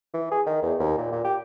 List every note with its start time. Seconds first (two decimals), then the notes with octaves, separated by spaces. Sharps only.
0.14 E3
0.31 G#4
0.46 D#3
0.63 E2
0.79 D#2
0.98 A#2
1.12 A#2
1.24 G4